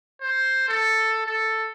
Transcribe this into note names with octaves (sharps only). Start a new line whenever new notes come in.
C5
A4
A4